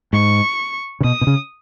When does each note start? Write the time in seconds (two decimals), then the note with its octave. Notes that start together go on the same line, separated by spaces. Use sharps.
0.13 G#2 C#6
1.00 C#3
1.04 B2 D#6
1.21 B2
1.27 C#3